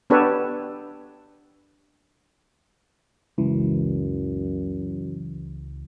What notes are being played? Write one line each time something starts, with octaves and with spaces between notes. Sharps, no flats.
B3 D4 G4 A4 B4 C#5
C#2 F#2 E3